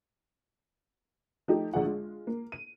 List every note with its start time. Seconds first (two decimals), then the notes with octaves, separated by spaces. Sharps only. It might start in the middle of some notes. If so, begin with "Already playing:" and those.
1.48 F3 A3 D#4 G4
1.74 A#1 D3 G#4 F#5
1.85 G#3 F4
2.27 A#3
2.52 D#7